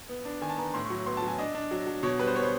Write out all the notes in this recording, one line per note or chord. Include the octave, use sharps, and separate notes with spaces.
B3
D4
D#3 G#5
A5
B3 A#5
A2 C6
C#6
F#3
B3 C6
A5
F#3
G#5
D4 D#5
D4
F#3
F#3
B2 C#5
G3 B4
C5
B3 C#5
C5